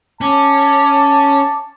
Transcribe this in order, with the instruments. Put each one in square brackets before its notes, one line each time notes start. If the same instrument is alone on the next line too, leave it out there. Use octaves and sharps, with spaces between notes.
[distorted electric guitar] C#4 [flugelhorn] A5 [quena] D6